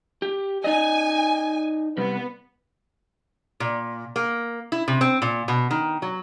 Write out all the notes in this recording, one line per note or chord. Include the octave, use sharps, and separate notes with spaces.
G4
D#4 D5 D#5 G#5
C3 G3 B3
A#2
A#3
E4
C3
C4
A#2
B2
D#3
F#3